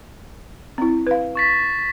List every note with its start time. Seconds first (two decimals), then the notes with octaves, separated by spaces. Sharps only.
0.78 C4 E4
1.07 B4 F5
1.35 C#6 A6 B6